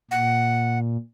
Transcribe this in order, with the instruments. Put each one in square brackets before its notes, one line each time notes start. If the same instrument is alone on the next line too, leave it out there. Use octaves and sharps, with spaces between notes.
[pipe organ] A#2 [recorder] F#5